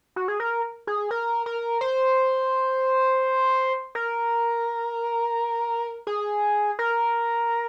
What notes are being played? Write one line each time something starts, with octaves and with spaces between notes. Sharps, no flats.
F#4
G#4
A#4
G#4
A#4
A#4
C5
A#4
G#4
A#4